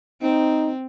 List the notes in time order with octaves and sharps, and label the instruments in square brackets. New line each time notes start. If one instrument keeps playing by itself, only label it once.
[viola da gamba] C4 [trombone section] D#4